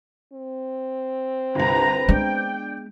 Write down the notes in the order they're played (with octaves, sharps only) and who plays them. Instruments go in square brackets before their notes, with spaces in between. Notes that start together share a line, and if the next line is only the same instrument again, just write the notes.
[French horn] C4
[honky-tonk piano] G1 C2 [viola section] B4 A#5
[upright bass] G#3 B3 [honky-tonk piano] D4 [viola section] G5